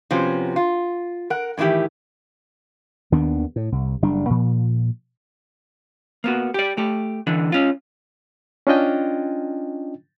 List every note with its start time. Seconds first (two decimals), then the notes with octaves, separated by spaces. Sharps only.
0.11 C3 F3 B3 C#4 F#4
0.56 F4
1.30 A#4 F#5
1.58 A2 D#3 E3 E4 G4
3.12 D#2 D#3 B3 D4
3.56 A2
3.72 C2
4.02 F#1 G3 D4
4.30 A#2 F3
6.24 A#3 B3 F#4
6.54 G4 D5
6.77 A3 G4
7.27 D3 E3 D4
7.52 C#4 F4
8.67 C#4 D4 F4 D#5 G5